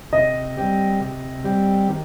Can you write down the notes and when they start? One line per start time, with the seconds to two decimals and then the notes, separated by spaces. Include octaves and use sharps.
0.12 C3 D#5
0.57 G3 C4 G4
1.01 C3
1.44 G3 C4 G4
1.89 D#3